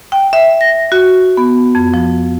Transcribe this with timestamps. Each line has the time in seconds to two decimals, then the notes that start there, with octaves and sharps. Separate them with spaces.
0.12 G5
0.33 E5
0.61 A#6
0.92 F#4
1.37 B3
1.75 F2
1.94 F3